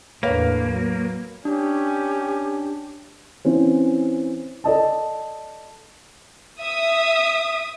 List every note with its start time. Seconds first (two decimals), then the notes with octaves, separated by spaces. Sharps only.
0.23 A1 E2 D3 A#3 B4 C#5 F5
0.67 F#3
1.45 C#4 D4 G4
3.45 E3 C4 C#4
4.64 A4 D5 D#5 A5
6.62 E5 D#6